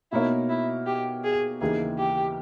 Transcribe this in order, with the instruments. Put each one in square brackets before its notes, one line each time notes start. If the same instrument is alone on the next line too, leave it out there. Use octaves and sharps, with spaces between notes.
[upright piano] B2 A#3 D#4 A#4 C#5 [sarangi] E4
[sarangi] E4
G4
G#4
[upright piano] D#2 C#3 E3 A#3 D#4 [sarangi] G#4
[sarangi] G4